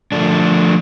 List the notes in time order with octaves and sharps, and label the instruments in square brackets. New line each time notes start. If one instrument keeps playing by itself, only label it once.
[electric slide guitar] F3 A3 D4